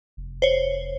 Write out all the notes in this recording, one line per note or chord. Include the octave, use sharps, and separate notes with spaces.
F1
C5 C#5